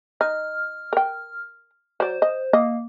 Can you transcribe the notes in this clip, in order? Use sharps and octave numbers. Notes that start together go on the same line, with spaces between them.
D#4 F6
A#4 G5
F#3 C5 D5
D#5
A#3 D#5